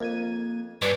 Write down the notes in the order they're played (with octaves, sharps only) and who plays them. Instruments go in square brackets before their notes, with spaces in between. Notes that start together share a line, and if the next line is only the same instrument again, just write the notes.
[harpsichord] F2 [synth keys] A#3 G#6 D#7
[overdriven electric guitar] G2 [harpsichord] C#4 D4 G#5 [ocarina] B4